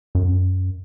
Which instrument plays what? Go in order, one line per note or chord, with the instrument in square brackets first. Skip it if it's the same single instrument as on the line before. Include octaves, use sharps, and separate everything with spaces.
[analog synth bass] F#2